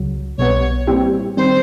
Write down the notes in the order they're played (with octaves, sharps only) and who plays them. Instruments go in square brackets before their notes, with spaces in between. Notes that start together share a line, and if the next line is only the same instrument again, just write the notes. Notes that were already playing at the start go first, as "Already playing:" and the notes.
Already playing: [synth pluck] C#2 C#3 F#3
[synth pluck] B1 B2 G3 B3 [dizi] C#5
[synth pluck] A#2 G3 C4 E4 G4
[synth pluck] D#3 G3 C4 [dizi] C5